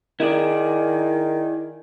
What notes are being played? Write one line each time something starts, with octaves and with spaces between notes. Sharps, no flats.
D#3 E4 G#4 D5